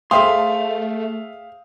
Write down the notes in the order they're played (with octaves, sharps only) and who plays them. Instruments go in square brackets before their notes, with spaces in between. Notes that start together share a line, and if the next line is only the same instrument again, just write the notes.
[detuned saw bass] A3 [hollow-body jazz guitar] G#4 C5 C6 [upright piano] E5 G5 D#6 [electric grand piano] F5